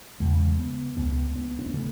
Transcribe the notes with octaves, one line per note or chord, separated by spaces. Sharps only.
E2 C#3 G#3
B3
C#2 C#3 B3
B3
C#4
B3
C#3 A3